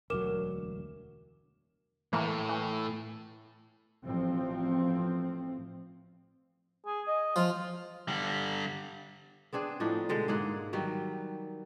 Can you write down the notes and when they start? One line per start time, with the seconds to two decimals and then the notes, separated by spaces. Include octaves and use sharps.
0.10 E1 D2 F#3 A#4 D6 E7
2.13 A2 E3 A3 A#3
2.49 E3
4.03 A1 F3 C4
6.86 G#4
7.07 D#5
7.36 F3 F4
8.08 D3 G3
9.53 B3 C4 D4 G#4
9.80 A2 F3 D4 D#4
10.09 B2 D3 G#3
10.28 G#2 A#3 G#4 F#5
10.73 D#3 F#3 G3 B4